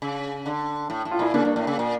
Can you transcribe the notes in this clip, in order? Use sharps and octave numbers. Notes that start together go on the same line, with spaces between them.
C#3
D3
A2
A2
F4
A#2 E4
C#3 A#3 D4
G2
A2
C#3
A#2